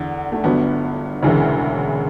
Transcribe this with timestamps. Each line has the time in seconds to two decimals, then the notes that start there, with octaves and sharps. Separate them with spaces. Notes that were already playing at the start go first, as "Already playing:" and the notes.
Already playing: E2 D3
0.32 A3
0.44 G1 G2 F#3 B3
1.23 E1 D2 C#3 E3